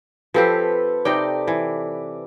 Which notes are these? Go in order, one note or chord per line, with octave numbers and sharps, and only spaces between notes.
F3 C4 G4 A4 B4
C3 D#4 D5 G5
E3